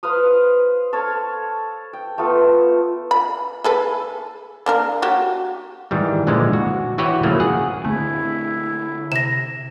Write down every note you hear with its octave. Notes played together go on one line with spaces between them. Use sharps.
B4 C5 F5 D#6
A4 C#5 F5
G5
A3 B3 F4 A4
B5
G#4 A4 B4
A#3 D4 A#4
F#4 G4 C#5
G#2 D#3 E3 G3
A#2 D3 E3 F3 G#3
F#4
E3 F#4 G4 B4 C#5 G5
C#3 F3 F#3 A3 A#3
G#4 F#5
D3 A3 C4 E4
C3 A#6 E7